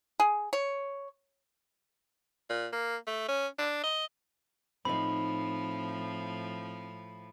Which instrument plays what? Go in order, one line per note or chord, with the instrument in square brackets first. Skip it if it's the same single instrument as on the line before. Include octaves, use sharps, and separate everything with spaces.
[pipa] G#4
C#5
[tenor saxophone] A#2
A#3
A3
C#4
D4
D#5
[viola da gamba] A2 F3 [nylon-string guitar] C4 D#4 [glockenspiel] B5